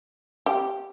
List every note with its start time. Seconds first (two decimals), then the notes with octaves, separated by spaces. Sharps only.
0.46 G4